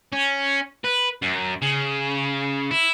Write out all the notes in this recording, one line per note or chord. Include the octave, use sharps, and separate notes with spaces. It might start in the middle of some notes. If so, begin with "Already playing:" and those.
C#4
B4
F#2
C#3
E4